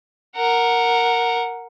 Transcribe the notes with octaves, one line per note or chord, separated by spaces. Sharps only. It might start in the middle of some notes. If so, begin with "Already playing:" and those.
A#4 F#5